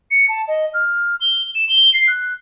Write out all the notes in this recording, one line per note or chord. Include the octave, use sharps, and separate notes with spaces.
C#7
A5
D#5
F6
G7
E7
G7
C7
F#6